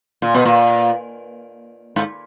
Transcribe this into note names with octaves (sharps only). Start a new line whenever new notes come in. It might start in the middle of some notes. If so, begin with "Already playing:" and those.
A#2
B2
A#2
G#2